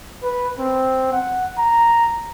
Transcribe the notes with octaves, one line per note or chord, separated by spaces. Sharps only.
B4
C4
F#5
A#5